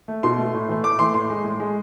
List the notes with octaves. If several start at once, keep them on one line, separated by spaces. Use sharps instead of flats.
A3
B2 C6
A3
A2
E3 A3
A2 D6
E3 A3 C6
A2 C6
G#3
A2
G#3